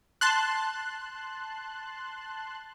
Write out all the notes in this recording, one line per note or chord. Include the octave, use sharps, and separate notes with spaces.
A5 C6 F#6